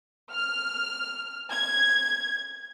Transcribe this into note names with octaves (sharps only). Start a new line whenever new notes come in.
F6
G#6